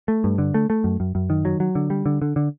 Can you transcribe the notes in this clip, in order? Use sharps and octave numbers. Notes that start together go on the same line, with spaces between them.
A3
G2
D3
A3
A3
F#2
F#2
F#2
D#3
F#3
F#3
D3
G3
D3
D3
D3